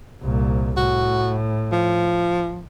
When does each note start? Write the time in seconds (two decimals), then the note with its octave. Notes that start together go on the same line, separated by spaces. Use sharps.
0.22 C2 A#2
0.77 A2 F#4
1.72 F3